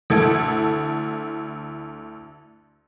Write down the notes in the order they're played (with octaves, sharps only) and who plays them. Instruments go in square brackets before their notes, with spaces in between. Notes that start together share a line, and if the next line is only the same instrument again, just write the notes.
[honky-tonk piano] D2 E4 A4 G#6 D7